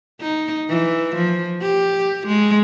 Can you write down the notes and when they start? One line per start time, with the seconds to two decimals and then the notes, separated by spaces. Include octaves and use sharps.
0.21 D#4
0.69 E3
1.15 F3
1.61 G4
2.27 G#3